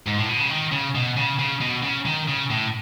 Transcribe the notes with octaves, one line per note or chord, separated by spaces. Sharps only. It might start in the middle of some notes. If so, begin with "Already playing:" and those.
G#2
A2
B2
C#3
D#3
C#3
B2
C#3
C#3
B2
C#3
D#3
C#3
A2